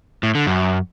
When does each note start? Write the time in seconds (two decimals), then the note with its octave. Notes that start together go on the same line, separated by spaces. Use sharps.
0.23 A2
0.35 D3
0.47 F#2